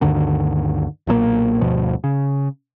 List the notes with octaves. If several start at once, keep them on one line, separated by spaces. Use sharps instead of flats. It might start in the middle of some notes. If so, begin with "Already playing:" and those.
D2 G2 D3 D#3
B1 A#2 E3 A#3
G1 D2 B2 F3
C#3